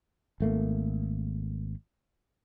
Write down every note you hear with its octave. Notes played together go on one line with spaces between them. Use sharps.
G#1 A3 A#3